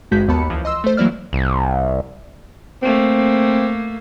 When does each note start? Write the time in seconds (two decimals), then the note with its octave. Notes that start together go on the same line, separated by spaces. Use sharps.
0.11 G#1 G2 G#3 F#4 G6 B6
0.28 D#2 B3 A5 B5 C#7
0.50 C#2 E3 F3
0.65 D#5 C6 E6
0.84 A3 C5
0.97 E3 F#3 A#3 E4 D5 F6
1.33 C2
2.83 A3 A#3 C4